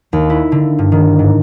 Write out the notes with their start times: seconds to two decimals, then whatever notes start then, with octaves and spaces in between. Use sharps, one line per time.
0.13 D#2
0.30 E4
0.52 D3
0.79 G2
0.92 D#3
1.19 G#2